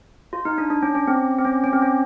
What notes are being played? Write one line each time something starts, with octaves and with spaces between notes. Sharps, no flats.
F4
D#4
D4
D4
C#4
C#4
C4
C4
C#4
C#4
C4
C#4